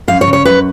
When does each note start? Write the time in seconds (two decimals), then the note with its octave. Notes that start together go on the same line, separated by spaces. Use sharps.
0.08 F#2 F5
0.21 C#5
0.27 C#3
0.33 C#5
0.45 F#2 B4